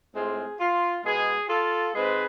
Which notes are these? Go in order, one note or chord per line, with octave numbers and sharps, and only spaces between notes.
A2 G#3 C4 F4 G#4
F4
B2 G#3 B3 G#4
F4 A4
G#2 G#3 C4 G#4 B4